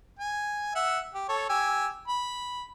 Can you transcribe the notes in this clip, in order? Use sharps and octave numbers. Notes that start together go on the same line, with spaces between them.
G#5
E5 F#5 E6
G4
A4 C#5
G4 G#5 E6
B5